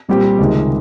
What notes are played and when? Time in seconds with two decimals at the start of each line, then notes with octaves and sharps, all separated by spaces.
0.09 A#2 G3 C4 G4
0.39 C#2 C3 D#3 G#3